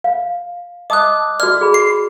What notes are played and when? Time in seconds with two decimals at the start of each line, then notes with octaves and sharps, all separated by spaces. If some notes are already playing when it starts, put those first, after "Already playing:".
0.04 F5
0.90 D#5 A5 D6 D#6 F#6
1.40 F#4 D5 F6
1.61 G#4 B5
1.74 F#4 C7